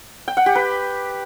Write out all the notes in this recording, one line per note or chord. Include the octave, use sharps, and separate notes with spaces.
G5
F#5
G4
B4